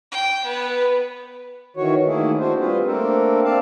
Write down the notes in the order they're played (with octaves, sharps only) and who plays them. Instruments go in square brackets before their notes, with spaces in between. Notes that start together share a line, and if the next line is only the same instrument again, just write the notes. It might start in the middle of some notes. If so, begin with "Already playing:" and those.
[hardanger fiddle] G5
B3
[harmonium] D#3 E3 F#4 C#5
D#3 A3 A#3 E4 G#4
D4 F#4 C5
G3 C4 F4 G#4 B4 C5
A3 A#3 C4 D4 A4 A#4
C4 D5 F5 A5